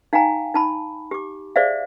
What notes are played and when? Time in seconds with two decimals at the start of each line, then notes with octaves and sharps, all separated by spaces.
0.13 D#4 F5 G5 G#5 A#5
0.54 D#4 A5 B5
1.11 G4 D6
1.56 G#4 C5 D5 E5 F5